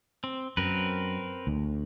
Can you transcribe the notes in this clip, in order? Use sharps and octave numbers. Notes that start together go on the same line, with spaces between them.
C4
F#2 C4 A#4 B4
D2